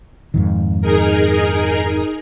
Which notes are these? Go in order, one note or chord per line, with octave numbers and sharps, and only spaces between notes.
F2 G#2 D#3
D#4 G#4 A#4